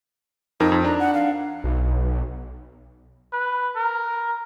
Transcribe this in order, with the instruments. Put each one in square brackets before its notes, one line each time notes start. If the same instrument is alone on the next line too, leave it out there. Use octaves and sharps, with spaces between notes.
[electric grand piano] F2 A#4 [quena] D#4
[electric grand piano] F2
[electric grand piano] D4 [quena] A#5
[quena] F#5
F5
[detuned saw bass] B1
[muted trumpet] B4
A#4